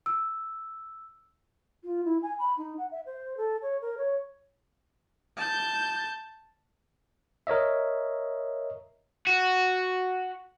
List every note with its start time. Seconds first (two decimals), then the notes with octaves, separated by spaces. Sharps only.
0.06 E6
1.82 F4
2.05 E4
2.22 G#5
2.39 B5
2.58 D#4
2.78 F#5
2.91 E5
3.06 C5
3.37 A4
3.62 C#5
3.81 A#4
3.98 C#5
5.37 A5 G6
7.47 A#4 C#5 D#5 E5
9.27 F#4